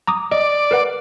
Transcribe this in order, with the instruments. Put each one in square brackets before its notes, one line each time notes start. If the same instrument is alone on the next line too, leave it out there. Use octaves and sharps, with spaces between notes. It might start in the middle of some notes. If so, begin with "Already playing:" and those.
[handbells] A#5 D6 D#6
[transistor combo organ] D5 [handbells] D#5
[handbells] A#4 B4 F#5